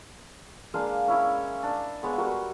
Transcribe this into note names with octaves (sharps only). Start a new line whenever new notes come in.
G#3 A#3 D4 F5
C#4 E4 C#5
D4
G#3 B3 C#5
G3 F#4 A#4